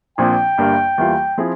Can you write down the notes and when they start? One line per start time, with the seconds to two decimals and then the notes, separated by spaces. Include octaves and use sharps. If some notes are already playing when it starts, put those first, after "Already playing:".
0.18 A#1 A#2 F3 C4 G5
0.58 G1 G2 G3 A#3
0.98 E2 E3 G3 A#3 F4
1.38 F3 C4 E4 G#4